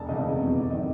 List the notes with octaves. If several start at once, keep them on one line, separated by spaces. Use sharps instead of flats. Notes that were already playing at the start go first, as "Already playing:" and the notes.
Already playing: E1 A5
E2 C#3 D#5
F1
E2 B2
G#1 D5
D#3 D#5